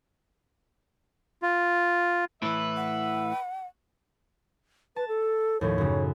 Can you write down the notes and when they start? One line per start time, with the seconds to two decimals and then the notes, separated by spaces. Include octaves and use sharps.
1.42 F4
2.43 A2 E3 B4 E5
2.77 F#5
4.96 B4 A5
5.08 A4
5.61 D#2 A2 F3 C#5
5.78 F#2 C#3